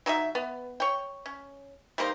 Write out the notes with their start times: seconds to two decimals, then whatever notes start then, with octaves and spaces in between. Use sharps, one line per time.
0.06 F#3 D#4 A4 E5
0.35 B3
0.80 C#5 G5
1.26 C#4
1.98 G3 A#3 D#4 C5